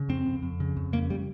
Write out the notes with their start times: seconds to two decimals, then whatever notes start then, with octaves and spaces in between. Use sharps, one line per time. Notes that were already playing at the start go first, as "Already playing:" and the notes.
Already playing: C#3
0.09 F2 C4
0.26 F2
0.43 F2
0.60 C#3
0.77 F2
0.93 C#3 A#3
1.10 G3